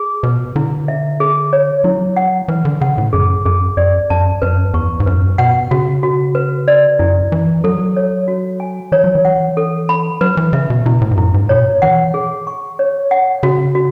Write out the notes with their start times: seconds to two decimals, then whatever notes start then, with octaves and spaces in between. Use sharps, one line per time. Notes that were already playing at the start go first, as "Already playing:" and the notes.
Already playing: G#4
0.23 B2 B4
0.56 D3 E4
0.88 E5
1.20 G#4
1.53 C#5
1.84 F#3 E4
2.17 F#5
2.48 E3 B4
2.65 D3
2.81 C#3 F#5
2.98 A2
3.13 F#2 G#4
3.46 F#2 G#4
3.77 F#2 D5
4.10 F#2 A5
4.42 F#2 B4
4.74 E2 C#6
5.00 G#2
5.06 F#2 B4
5.38 B2 F#5
5.71 C#3 F#4
6.03 F#4
6.35 B4
6.68 D5
6.99 F#2 E4
7.32 E3 E4
7.64 F#3 A4
7.97 C#5
8.28 F#4
8.60 G#5
8.92 E3 C#5
9.04 F#3
9.15 E3
9.25 F#5
9.57 A4
9.89 B5
10.21 F#3 B4
10.37 E3
10.53 C#3 E5
10.70 B2
10.86 B2 E4
11.01 A2
11.11 G#2
11.17 F#2 E4
11.34 G#2
11.49 B2 C#5
11.82 E3 F#5
12.14 G#4
12.47 C#6
12.79 C#5
13.11 F#5
13.43 C#3 F#4
13.75 F#4